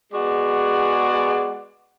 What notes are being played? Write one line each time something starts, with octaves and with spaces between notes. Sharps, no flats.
G#3 B3 F#4 G#4 D5 F#5